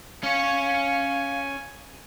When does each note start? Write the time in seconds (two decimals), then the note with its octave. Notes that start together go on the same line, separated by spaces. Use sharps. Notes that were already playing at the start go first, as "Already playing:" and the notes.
0.23 C#4 C#5 F5 G#5